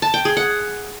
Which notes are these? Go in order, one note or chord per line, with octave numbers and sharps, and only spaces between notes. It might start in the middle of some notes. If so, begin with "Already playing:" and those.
A5
G5
G#4
F#5